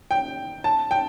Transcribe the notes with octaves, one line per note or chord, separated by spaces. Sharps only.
G5
A5
G5